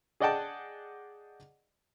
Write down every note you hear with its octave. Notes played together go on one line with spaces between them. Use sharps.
G#4 D5 D#5 F#5 G5 A5